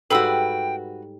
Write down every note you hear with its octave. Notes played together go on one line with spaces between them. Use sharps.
G#2 G3 F#4 A4 B4 F5 G5 E6